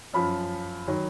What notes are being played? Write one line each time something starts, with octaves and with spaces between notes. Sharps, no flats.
F#2 F3 B5
D#3 F#3